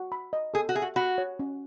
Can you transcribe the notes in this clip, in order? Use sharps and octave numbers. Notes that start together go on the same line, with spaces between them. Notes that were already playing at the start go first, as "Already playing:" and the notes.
Already playing: F#4
B5
D#5
G#4 A4
F#4
G#4 E5
F#4
F#4 B5
C#5
C#4